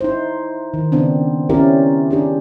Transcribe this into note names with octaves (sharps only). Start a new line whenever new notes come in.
D#4 E4 C5
D#3
C#3 B3 C4 D4
C4 C#4 E4 G4 A#4 D5
D4 G4 G#4